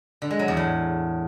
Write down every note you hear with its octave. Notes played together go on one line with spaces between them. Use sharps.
D3
G#3
F#3
E2
A2